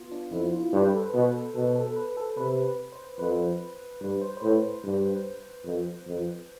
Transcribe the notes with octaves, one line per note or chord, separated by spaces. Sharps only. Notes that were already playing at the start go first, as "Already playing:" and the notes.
Already playing: B3 F4
D4
F2 E4
F4
G2 C5
B4
A4
B4
B2
B2 A4
A4
A4
B4
A4
C3 B4
B4
C5
F2 B4
G2 B4
C5
C5
A2 B4
G2
F2
F2